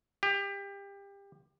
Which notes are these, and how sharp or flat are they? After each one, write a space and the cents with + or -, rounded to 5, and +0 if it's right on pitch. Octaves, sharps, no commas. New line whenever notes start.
G4 +25